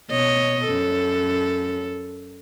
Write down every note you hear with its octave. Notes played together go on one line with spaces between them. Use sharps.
B2 C#5 D#5
F#2 A4